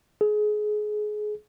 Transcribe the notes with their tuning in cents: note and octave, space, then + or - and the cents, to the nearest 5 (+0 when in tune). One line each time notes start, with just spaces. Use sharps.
G#4 +25